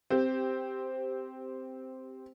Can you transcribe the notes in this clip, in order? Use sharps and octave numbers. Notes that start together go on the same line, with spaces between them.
C4 G4